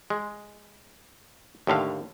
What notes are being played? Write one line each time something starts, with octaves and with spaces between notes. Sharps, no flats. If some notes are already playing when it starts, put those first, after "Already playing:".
G#3
D#2 A2 D3 F5